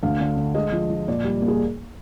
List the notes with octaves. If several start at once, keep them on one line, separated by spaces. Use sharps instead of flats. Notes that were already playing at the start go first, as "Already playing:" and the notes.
D2 F5
D3
D3
G#3 D#5
F3
F3
A#2 D5
G3
A#3
G#4